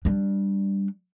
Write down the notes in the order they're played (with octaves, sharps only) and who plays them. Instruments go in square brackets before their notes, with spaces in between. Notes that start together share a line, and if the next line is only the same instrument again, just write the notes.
[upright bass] G3 D4